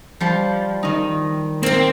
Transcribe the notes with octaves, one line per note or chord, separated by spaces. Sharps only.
F3 G3
D#3 D#4
C3 A#3 C4